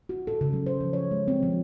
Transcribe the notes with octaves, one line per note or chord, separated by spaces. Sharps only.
F#4
A4
C#3
F#3
C5
F3
C#5
G#3
C4
F3